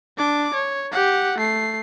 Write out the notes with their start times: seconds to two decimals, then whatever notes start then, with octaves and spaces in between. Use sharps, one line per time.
0.17 D4 D6
0.54 C#5
0.92 G4 F#5
1.38 A3 C7